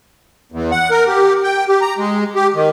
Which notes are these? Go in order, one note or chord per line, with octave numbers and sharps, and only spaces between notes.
E2
F#5
A#4
G4
G5
G4
A#5
G#3
G4
D#3